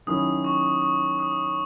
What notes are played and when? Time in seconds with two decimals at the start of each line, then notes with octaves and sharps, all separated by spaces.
0.07 D#3 F#3 C#4 E4 D#6
0.44 C#6
0.82 C#6
1.19 D#6